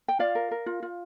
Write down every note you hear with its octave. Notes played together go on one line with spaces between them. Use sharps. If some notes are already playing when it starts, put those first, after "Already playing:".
G5
F4 D5 F5
A#4
A#4
F4
F4